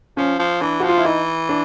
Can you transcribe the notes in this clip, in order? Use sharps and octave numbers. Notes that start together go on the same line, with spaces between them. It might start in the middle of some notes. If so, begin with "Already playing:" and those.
F3 C#4
F3
E3 D4
F3 F#4
F4
E4
E3 D#4
D4